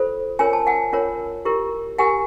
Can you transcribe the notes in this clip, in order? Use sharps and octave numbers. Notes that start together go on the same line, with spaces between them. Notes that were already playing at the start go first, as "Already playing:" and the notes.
Already playing: F4 A4 C5
C#4 F4 A#4 C#5 G#5
A5
F#5 G#5
C#4 F4 A#4 C#5
E4 G4 A#4
E4 G4 A#4 F#5 G#5